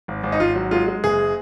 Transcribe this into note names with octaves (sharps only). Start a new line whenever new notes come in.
G#1
G#1
D#4
G#1 F4
F#3
G#3 F4
G#3
F#1 G#4